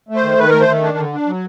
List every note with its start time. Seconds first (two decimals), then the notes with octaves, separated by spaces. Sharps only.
0.09 A3
0.16 C5
0.24 D#3
0.38 D#3 B4
0.49 A3 A#4
0.61 C5
0.68 D#3
0.83 D4
0.98 D3
1.13 D4
1.27 F#3